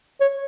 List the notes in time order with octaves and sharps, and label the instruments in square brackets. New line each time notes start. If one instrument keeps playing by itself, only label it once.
[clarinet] C#5